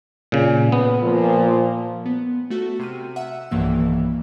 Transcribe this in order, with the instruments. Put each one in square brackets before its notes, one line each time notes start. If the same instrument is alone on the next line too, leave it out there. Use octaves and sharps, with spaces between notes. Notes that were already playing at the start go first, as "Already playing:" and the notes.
[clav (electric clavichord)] A#2 C#3
B3
[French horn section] A#2 F3
[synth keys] B3
A3 F#4 A4
C3 F6 D#7
E5 F#5 E6
B1 G2 D#3 E3 A#3 E6